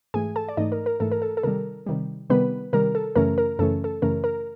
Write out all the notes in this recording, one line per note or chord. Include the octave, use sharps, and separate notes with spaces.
G#2 E3 A3 G#4 G#5
A4 A5
D5
G#2 E3 A3 D#4 D#5
A#4
A#4
G#2 E3 A3 A4
A#4
A4
A4
C3 D#3 G3 A#4
C3 D#3 G3
C3 D#3 G3 B3 B4
C3 D#3 G3 A#4
A4
F#2 C#3 E3 A3 C#4 A#4
A#4
F#2 C#3 E3 A3 C#4 A4
A4
F#2 C#3 E3 A3 C#4 A#4
A#4